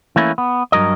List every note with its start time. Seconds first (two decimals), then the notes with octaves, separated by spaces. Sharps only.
0.16 E3 A3 A#3 C#4 E4
0.38 B3
0.72 G2 F#3 A#4 D#5